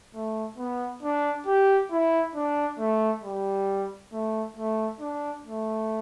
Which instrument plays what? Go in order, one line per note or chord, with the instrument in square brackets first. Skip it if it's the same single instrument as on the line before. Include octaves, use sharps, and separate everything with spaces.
[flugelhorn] A3
B3
D4
G4
E4
D4
A3
G3
A3
A3
D4
A3